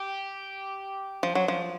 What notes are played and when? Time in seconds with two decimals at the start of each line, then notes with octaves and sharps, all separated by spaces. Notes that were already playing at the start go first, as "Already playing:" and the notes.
Already playing: G4
1.23 F3
1.35 F#3
1.48 F3